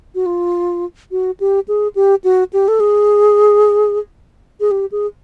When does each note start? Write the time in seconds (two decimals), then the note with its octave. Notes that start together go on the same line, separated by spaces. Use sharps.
0.15 F#4
0.26 F4
1.11 F#4
1.40 G4
1.68 G#4
1.95 G4
2.24 F#4
2.53 G4
2.68 A4
2.80 G#4
4.60 G#4
4.71 G4
4.92 G#4